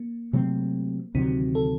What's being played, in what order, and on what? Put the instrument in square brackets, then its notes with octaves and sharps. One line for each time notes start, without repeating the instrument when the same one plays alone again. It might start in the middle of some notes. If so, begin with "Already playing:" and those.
Already playing: [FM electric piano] A#3
[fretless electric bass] C3 F#3 A3 C4
[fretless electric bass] D2 C3 D#3 F#3 [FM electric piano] C4
[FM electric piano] A4